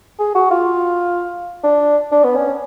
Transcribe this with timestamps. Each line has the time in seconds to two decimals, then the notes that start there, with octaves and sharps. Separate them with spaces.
0.19 G#4
0.35 F#4
0.51 F4
1.64 D4
2.11 D4
2.24 B3
2.36 C#4